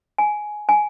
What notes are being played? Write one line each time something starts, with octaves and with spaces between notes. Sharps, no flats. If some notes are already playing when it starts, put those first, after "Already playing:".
G#5
G#5